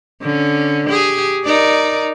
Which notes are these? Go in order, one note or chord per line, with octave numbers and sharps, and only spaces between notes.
D3 C#4
G4 G#4
D#4 A#4 D5